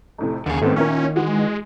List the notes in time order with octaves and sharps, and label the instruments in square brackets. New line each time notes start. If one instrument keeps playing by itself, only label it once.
[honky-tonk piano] F2 A2 C3
[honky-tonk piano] F#1 [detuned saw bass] D#2 [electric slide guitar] D3 G#4
[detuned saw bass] G#2 [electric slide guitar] D#3 [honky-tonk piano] A3 B3 C4
[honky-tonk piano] A#2 E4 A#4 [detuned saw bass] C#4
[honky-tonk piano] E3 F#4 [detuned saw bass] G#3